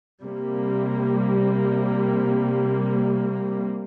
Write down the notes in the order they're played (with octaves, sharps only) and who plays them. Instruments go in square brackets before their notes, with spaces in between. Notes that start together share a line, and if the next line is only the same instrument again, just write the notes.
[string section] C3 G3 A#3